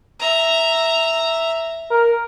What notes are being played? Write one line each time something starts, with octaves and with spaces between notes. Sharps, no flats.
E5 A#5
A#4